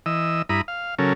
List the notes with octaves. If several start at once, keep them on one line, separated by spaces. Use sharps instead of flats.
E3 D#5 E6
G2 E4 A#5 B5 D#6
F5
C#3 F#3 C#4 A4 A#4